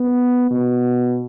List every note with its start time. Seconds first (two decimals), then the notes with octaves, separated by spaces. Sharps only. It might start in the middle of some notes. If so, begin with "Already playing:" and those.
Already playing: B3
0.51 B2